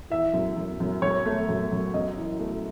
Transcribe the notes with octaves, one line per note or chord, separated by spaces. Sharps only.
E3 E5
F#2
F#2
F#2
F#2 C#5
A3
F#2
F#2
F#2 D#5
E3
A3